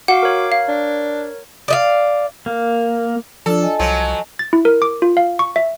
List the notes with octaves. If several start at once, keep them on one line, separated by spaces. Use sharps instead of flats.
F#4 F5 F#5 D6
A#4 C#5
F5
D4
D5 D#5 F5
A#3
F3 D4 F4 A4 D5
D#5 G#5 A5
C2 F3 F#3
A6
E4
A#4
D6
F4
F5
C#6
E5